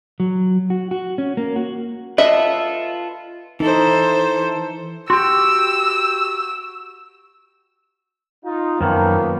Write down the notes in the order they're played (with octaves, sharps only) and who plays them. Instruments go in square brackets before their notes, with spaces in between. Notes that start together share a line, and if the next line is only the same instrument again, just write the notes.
[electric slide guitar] F#3
F#4
F#4
C#4
A#3
F#4
[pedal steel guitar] F4 A4 B4 [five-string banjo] D#5 E5
[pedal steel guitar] E3 [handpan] D#4 [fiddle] A4 C5
[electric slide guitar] F#4 G4 [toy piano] C6 [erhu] E6
[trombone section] D#4 F4
[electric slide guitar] F#2 D#3 [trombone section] F3 [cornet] A#3 [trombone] B3